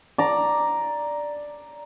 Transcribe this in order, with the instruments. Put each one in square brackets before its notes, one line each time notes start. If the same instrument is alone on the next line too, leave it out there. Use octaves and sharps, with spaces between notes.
[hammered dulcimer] D5 A#5